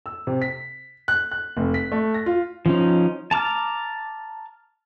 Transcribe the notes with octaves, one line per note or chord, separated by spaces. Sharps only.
E6
C3
B6
F#6
F#6
F1
B6
A3
A#6
F4
F3 C#4 D#4
A5 A#5 D6 F6